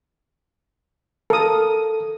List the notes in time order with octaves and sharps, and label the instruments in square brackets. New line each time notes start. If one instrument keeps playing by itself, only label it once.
[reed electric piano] A4 [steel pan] A#4 D#6